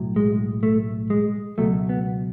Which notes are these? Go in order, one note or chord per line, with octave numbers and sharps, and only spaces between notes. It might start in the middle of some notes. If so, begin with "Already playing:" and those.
Already playing: B1 A2 F#3
G#3
A3
G#3
C#2 B2 F#3 A3
B3